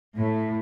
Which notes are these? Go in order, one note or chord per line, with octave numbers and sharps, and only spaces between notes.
A2